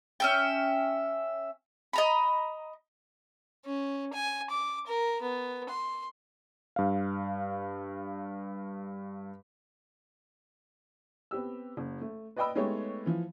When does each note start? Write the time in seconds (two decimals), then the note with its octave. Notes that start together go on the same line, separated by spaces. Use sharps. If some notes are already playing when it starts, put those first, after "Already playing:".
0.20 C#4 E5 G5
1.93 D#5 A#5 B5
3.65 C#4
4.14 G#5
4.50 D6
4.87 A#4
5.22 B3
5.69 C6
6.76 G2 F5
11.31 B3 C4 G4 E6
11.77 F#1
12.01 A3
12.36 B4 D5 D#5 G5 B5 E6
12.55 G#3 A3 B3 D#4 G4 C#5
13.06 E3 F3